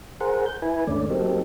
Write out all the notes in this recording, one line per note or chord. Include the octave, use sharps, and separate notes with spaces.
G#4 A#4 C5 F#5
G6
E4 B4 G#5
D#2 G#2 D3 A3 C#4 D5
F#3 A#3 C4 D#4 G4 A4